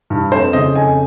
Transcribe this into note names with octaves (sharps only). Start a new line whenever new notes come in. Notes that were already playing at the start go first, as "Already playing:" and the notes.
G2
F2 C5
C#3 D#5
F2 G#5